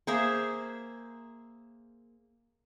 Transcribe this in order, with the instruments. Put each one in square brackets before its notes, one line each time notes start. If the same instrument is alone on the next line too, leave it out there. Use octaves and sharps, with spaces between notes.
[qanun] A#3 G#4 C5 E5